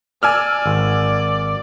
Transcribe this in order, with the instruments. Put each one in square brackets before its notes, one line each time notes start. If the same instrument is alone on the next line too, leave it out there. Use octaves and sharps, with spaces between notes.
[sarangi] D5 [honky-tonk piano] G#5 E6 F6
[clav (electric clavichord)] G#1